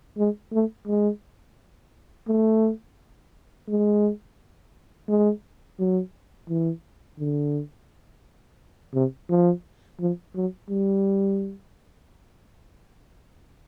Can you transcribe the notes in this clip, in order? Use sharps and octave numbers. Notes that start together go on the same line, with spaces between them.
G#3
A3
G#3
A3
G#3
G#3
F#3
E3
D3
C3
F3
F3
F#3
G3